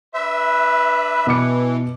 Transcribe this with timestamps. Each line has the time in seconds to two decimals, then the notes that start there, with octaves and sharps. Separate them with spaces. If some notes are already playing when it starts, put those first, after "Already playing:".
0.14 D4 B4 E5
1.27 B2 E3 D6 C#7